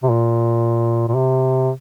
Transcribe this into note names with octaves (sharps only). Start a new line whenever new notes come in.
C3
A#2
A#2
C3